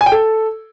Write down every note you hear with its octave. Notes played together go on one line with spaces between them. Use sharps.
G#5
G5
A4